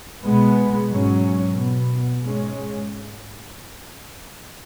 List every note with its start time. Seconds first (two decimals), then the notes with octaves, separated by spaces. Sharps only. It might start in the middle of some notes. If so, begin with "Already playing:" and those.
0.24 B2 G#3 B3
0.89 G#2 F#3 C#4
1.54 B2 B3
2.20 G#2 G#3 C#4